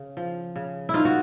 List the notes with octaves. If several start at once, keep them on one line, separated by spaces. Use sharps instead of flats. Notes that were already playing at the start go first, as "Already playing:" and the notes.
Already playing: C#3
F3
C#3
E4
A#3 D#4 F4
F#4